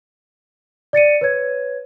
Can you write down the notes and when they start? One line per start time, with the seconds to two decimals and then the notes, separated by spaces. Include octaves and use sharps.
0.93 D5 A6 C#7 D#7
1.21 B4 C#5 G#6